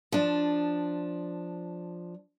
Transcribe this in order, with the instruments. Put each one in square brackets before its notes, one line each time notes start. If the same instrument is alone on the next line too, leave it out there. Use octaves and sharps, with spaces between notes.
[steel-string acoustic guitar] F3 D4